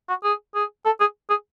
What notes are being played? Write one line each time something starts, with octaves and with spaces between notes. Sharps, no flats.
F#4
G#4
G#4
A4
G#4
G#4